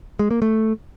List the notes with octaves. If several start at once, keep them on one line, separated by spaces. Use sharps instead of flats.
G#3
A#3
A3